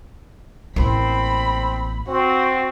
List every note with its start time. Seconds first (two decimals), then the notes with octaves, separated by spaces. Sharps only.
0.76 A1 A#3 C4 B5
2.08 C4 F#4